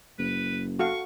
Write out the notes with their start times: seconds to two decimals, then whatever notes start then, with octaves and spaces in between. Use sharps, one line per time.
0.19 F#1 B4
0.79 F#4 A4 F5 C#6